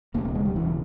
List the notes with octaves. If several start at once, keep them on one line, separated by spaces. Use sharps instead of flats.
E1 D#2 C#3 A#3
A#3
G#3
G3
E1 D#2 C#3 E3